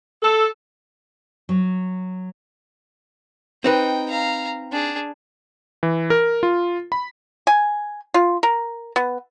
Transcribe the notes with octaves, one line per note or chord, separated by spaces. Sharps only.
A4
F#3
C4 D#4 B4 G5
F5 A#5
D4 G#4
E3
A#4
F4
B5
G#5
F4
A#4
B3